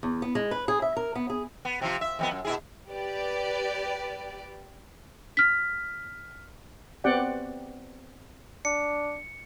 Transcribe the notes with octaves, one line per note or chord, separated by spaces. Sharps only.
E2
B3
G#3
B4
G#4
E5
A#4
B3
G#4
B3
C3 F3 F4
E5
F2 G3 B3
F#2
B2 E4 G#4
G4 B4 D5
F6 B6
B3 C4 G4 D5 F#5 G5
D4 C#7